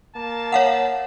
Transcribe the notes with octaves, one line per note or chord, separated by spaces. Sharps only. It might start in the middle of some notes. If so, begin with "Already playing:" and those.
A#3 A5
C#5 F5 F#5